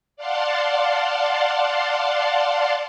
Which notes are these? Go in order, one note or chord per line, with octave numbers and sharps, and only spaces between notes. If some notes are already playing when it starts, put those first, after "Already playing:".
D5 F5 F#5 A5 C6